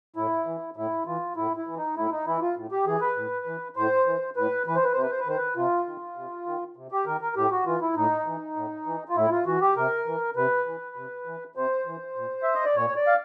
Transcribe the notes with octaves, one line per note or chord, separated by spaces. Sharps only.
A2 E4
E3
A2 E4
E3 F4
A2 E4
E4
E3
D#4
A2 E4
D#4
E3 E4
F4
A2
G4
E3 G#4
B4
A2
E3
A2 C5
E3
A2 B4
E3 B4
C5
B4
C3 C5
B4
C5
B4
D#3 C5
B4
C3 F4
D#3
C3
D#3
C3
G4
D#3 A#4
A#4
A2 G4
F#4
E3 F4
E4
A2 D#4
E3
A2
E3
F4
A2 E4
F4
E3 F#4
G4
C3 A#4
E3
C3 B4
E3
C3
E3
C3 C5
E3
A#2
E5
D#5
D5
A#2 C#5
D5
F5